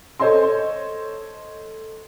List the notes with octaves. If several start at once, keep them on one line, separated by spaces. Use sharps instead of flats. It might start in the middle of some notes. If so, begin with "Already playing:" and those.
A4 C5 C#5 D#5 C6